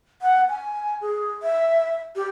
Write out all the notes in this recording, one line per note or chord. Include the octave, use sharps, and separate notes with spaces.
F#5
G#5
G#4
E5
G4